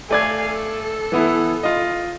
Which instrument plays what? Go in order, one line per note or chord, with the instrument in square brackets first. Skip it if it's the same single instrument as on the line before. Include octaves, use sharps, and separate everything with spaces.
[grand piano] A3 D5 G#6 [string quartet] A4 F5 G#5
[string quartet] A4
[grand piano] E3 B3 E4
F4 D#5